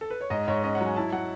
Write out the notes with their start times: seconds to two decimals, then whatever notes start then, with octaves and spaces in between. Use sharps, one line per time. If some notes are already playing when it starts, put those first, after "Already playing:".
0.01 A4
0.10 B4
0.21 C#5
0.30 G#2 D#5
0.48 G#2 C#5
0.63 C#4 D#5
0.75 F#5
0.81 F#3 G#5
0.96 E4 A5
1.12 F#3 F#5